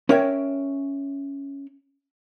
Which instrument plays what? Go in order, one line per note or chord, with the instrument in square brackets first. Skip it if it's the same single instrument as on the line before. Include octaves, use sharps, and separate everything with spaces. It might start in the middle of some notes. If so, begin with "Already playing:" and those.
[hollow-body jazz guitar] C#4 A#4 C#5 E5 G5